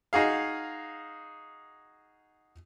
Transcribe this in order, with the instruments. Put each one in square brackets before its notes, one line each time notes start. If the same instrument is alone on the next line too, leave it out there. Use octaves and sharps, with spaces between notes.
[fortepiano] D#4 F#4 G#4 F5